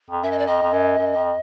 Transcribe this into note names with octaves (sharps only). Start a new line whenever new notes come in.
F2
F#2 E5
D#5
D5
F2 D#5
F2
F#2
F#2
F2